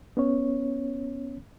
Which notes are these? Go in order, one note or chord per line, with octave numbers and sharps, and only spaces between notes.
B3 C#4 C#5